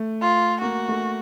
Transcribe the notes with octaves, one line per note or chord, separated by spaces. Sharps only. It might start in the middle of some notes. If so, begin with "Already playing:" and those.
Already playing: A3
F4
A#3 F#4
A3